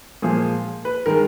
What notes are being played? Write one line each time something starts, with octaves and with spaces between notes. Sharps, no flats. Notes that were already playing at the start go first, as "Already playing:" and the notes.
A#2 F3 G#3 G#4
B4
D#3 G#3 A#4